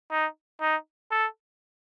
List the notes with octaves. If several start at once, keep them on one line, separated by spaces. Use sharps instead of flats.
D#4
D#4
A4